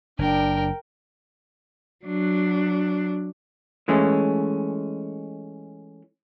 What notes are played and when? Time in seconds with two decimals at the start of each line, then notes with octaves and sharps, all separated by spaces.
0.19 F#1 D4 A#4 G5
2.05 F#3 D4
3.88 E3 G#3 A3 C#4